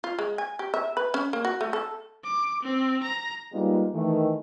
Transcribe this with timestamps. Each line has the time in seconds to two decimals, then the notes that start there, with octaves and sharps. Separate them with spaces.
0.04 F4
0.19 G#3
0.38 G#5
0.59 G4
0.74 E5
0.97 B4
1.14 C#4
1.33 A#3
1.45 F#4
1.61 A3
1.73 A4
2.24 D6
2.63 C4
3.03 A#5
3.53 G3 G#3 A#3 B3 D#4 F4
3.94 D#3 E3 A3